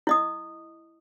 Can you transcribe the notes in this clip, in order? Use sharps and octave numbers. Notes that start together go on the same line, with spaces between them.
E4 D#5 D#6